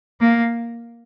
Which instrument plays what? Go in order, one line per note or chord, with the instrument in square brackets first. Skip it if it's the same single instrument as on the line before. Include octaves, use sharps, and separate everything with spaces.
[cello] A#3